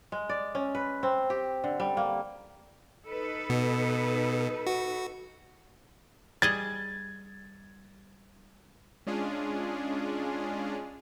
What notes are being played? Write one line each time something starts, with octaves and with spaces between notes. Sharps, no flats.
G#3
D5
C#4
B4
C4
G4
D3
G3
A#3
D#4 A4 B4
B2
F#4
G3 G#4 D#5 G#6 A6
G#3 C#4 D4 F4 G#4